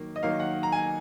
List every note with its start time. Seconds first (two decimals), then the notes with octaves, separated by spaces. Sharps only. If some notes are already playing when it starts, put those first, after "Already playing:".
Already playing: D#3 F#3 A#3
0.16 D#5
0.23 D#3 F#3 A#3 F5
0.40 F#5
0.63 A#5
0.72 G#5